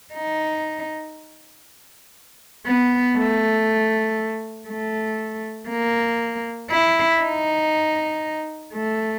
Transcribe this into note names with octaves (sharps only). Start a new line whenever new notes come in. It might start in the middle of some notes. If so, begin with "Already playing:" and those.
D#4
B3
A3
A3
A#3
E4
D#4
A3